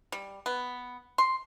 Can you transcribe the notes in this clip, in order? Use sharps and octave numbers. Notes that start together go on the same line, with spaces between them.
G3
B3
C6